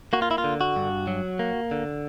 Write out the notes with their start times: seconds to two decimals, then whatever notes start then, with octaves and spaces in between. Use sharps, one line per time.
0.13 A#3 F#4
0.22 F4
0.31 E4
0.38 F4
0.44 D3
0.61 F#4
0.76 G2
1.07 F#3
1.39 A#3
1.71 D3